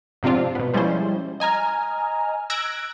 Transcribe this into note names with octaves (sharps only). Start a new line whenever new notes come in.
G#2 C3 F3 C4 D4 F4
B2 B3
F3 G3 G#3 C#4 E4 C5
D#5 G#5 A#5 F6
E6 F#6 G#6 A#6 D7